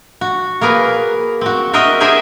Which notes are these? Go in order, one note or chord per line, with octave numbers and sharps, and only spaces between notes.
F#4
A#3 G#4 A#4 B4
C4 F#4
F#4 A#4 C5 D#5 E5
G4 G#4 A#4 C5 E5 G#5